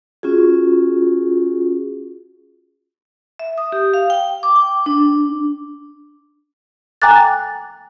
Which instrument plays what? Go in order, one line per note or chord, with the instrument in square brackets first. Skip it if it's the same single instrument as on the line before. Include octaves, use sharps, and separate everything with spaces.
[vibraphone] C#4 F4 F#4 G#4
E5
D#6
G4
F5
G5
D6
G5
D4
[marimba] G5 G#5 A#5 D6 F#6 A6